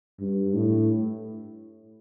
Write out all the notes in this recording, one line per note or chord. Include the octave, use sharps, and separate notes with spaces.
G2
A2